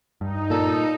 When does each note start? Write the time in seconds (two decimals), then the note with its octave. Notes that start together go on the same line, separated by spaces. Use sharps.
0.21 G2 D#4
0.50 A#2 A4